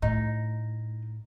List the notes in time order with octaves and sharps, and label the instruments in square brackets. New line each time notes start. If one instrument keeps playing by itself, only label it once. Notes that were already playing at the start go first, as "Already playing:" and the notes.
[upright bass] A2 [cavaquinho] D#4